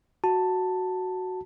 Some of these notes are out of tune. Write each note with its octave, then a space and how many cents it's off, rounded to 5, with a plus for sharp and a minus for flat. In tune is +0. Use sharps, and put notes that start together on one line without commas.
F#4 +0 A5 +10